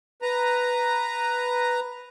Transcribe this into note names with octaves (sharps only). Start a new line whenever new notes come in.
B4 A#5